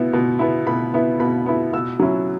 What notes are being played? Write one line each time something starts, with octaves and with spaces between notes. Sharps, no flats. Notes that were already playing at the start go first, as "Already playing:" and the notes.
Already playing: B2 B3 E4
B2
B3 E4
B2 B5
B3 E4
B2 B5
B3 E4
B2 E6
F#3 C#4 E4